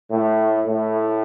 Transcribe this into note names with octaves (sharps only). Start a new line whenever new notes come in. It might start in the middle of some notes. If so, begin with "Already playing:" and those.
A2
A2